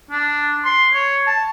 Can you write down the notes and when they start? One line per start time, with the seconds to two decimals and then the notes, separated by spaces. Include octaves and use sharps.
0.11 D4
0.65 C6
0.94 C#5
1.27 A5